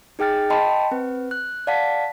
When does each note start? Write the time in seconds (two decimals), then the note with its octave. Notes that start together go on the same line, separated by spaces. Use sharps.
0.19 D#4 G#4 G5 F6 A6
0.50 D#5 G5 A5 B5 C6
0.91 C4 B4
1.31 F#6
1.67 D5 F5 F#5 A5 B6